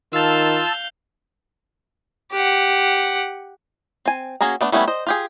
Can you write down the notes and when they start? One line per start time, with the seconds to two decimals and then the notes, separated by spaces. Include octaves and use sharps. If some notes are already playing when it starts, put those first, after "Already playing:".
0.13 D#3 F4 F5 A5 E6 G6
2.32 G4 F#5
4.05 C4 G#5
4.41 A#3 C#4 F#4 G#4 A#5
4.61 A3 B3 D4
4.72 G3 A3 B3 C#4 E4
4.88 C5 D#5
5.07 F4 G4 G#4